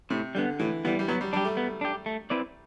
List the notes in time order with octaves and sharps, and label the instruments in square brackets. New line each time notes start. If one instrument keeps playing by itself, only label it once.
[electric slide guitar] A2 [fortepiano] C3
[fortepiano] D3 [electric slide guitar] G3
[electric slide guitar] B3
[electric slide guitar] A2 [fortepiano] E3
[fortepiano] E3 [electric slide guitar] G3 B3
[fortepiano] G3
[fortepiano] F#3 [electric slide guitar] B3
[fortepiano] G3
[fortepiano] G3 [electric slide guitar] D4
[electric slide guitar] G4
[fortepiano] A3
[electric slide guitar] B3
D4 G4
A3
C4 E4 B4 D5